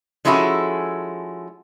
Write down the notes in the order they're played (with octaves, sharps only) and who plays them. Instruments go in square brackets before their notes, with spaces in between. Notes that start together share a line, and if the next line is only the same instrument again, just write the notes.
[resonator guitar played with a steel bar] F3 G#3 C#4 E4 F#4 A4